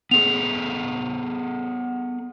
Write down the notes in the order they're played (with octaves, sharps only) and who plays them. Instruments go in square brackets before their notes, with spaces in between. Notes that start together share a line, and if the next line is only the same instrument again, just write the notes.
[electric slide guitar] B3 G#4 A4 [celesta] F7